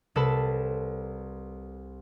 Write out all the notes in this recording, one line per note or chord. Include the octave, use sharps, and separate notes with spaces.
C2 A4 B4 A5 B5